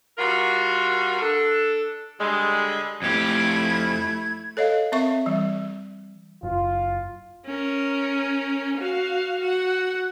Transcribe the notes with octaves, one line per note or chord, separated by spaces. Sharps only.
G3 F4 F#4 A#4
D4 A4
D3 G3 G#3
F2 A3 E4 G4 G#6
A4 C#5 D#5 F5
C4 A#4 E5 C#6
E3 G3
F#1 F4
C#4 A#4
F#4 F5
F#4 F#5